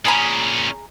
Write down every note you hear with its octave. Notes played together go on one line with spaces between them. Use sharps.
A#2 C#4 G#4 A#5 B5